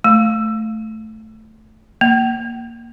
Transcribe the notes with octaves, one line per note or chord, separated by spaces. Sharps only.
A3
A#3